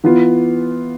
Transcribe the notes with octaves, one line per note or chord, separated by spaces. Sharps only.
E3 B3 F4